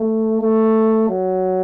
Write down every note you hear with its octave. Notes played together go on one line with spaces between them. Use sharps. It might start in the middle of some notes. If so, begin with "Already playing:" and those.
Already playing: A3
A3
F#3